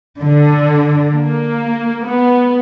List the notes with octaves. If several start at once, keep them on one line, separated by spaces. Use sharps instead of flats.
D3
A#3
B3